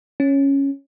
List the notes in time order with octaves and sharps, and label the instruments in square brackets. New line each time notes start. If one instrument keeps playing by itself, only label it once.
[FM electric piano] C#4